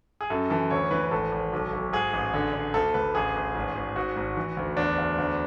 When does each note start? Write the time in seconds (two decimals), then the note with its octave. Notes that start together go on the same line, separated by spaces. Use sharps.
0.21 G#4
0.30 F#2 A4
0.50 E3 A4
0.70 D2 C#5
0.91 E3 B4
1.11 G#1 A4
1.32 G#1
1.53 B1
1.73 B1
1.93 G#2 G#4
2.13 A1
2.34 D3
2.53 D3
2.74 D2 A4
2.94 D2 B4
3.15 A1 G#4
3.36 A1
3.55 G#1
3.76 G#1
3.96 G#2 F#4
4.17 G#1
4.37 E3
4.57 D2
4.77 E2 D4
4.98 E2
5.18 D2